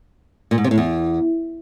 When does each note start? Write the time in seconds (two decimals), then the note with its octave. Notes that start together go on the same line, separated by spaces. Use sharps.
0.51 A#2
0.58 G#2
0.64 C3
0.71 A2
0.78 E2